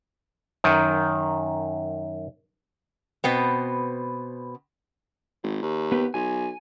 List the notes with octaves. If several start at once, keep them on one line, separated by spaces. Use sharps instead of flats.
F#2 D#3
B2 B3 C4
G#1
D#2
B3 G4 B4
B1 G#5